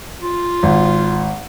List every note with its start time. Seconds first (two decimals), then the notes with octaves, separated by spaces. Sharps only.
0.22 F4
0.63 G#1